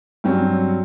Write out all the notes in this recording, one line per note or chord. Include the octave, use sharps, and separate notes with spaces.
G2 F#3 C4 C#4